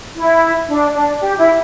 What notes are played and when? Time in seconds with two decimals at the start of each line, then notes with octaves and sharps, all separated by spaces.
0.15 E4
0.68 D4
0.94 D4
1.21 G4
1.38 E4